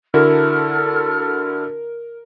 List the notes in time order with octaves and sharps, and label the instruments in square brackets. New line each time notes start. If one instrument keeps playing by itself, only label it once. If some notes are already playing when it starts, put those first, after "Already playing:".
[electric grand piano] D3 E4 F#4 [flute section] A4 F6 [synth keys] A#4